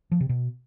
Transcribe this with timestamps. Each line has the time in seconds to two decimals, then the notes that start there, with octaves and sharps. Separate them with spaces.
0.11 F3
0.20 C3
0.29 B2